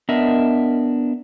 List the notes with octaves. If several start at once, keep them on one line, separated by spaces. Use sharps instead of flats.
B3 D4 A#4 D#5 E5